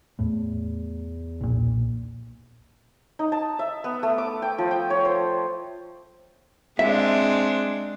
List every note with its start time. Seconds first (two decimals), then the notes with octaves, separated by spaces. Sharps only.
0.19 E2 A2
1.41 B1 A#2
3.19 D#4
3.32 A5
3.59 E5
3.84 B3
4.03 A3
4.18 D6
4.42 G5
4.58 F3
4.71 G5
4.90 C#5
5.05 C5
6.79 G#3 C4 D4 E5